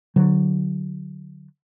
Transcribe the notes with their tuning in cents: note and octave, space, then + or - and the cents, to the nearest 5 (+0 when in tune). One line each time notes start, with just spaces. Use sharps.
D3 +10 F#3 +0